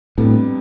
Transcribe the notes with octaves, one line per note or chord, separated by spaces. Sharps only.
F2 A2 C3 G3 B3 D4